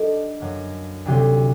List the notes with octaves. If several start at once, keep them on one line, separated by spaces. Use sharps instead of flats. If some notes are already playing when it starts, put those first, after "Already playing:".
Already playing: G3 D4 A4 D#5
F#2 F#3 A#3
D2 C3 F#3 C4 G4